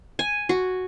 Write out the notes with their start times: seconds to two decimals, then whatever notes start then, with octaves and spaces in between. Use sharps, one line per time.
0.19 G#5
0.49 F#4